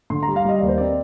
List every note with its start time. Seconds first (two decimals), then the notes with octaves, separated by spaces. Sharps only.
0.10 D3 C6
0.23 A#5
0.27 G3
0.36 F5
0.45 G3 D#5
0.59 D#2 D5
0.68 C5
0.78 C4 D5